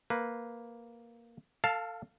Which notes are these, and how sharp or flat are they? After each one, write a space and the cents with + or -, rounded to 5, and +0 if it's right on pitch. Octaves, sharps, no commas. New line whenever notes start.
A#3 +0 B4 +0
A4 +30 F5 +0 A5 +0